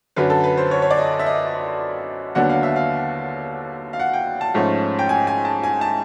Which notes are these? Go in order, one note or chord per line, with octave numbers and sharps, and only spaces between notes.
F#2 D3 F#3 B4
A4
B4
C5
C#5
C#5
D5
D#5
E5
D#5
D#2 D3 F#3 B3 D4 F#5
F5
E5
F5
F5
F#5
G5
A5
G#2 F3 A3 C#4
G5
G#5
G#5
A5
G#5
A5